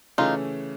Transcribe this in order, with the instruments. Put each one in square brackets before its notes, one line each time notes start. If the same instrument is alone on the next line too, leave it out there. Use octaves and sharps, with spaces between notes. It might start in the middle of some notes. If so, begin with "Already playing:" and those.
[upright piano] C#3 E3 A3 C#4 [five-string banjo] D#4 F4